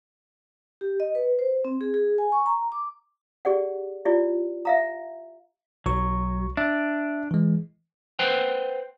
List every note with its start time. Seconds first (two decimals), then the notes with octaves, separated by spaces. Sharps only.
0.81 G4
1.00 D#5
1.15 B4
1.39 C5
1.65 C4
1.81 G#4
1.94 G#4
2.18 G#5
2.32 C#6
2.46 A#5
2.72 D6
3.45 G4 G#4 D5 F#5
4.05 E4 F4 G4 D5
4.65 E5 F5 A#5
5.86 B1 F#3 C#6
6.57 D4 E5
7.31 E3 G#3
8.19 B4 C5 F#5 G5